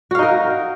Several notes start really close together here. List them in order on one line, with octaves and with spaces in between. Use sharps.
F#4 F5 D#4 A#4